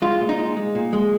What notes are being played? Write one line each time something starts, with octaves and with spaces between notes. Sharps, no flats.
G#3 F4
A#2
D#4
G#3
G#3
A#2
G#3